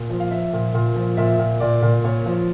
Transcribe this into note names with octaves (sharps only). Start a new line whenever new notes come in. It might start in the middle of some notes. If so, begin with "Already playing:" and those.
Already playing: A#2
F3
F5
F3 E5
A#2
A#2
F3
A#2 E5
A#2
A#2 D5
A#2
A#2 C#5
F3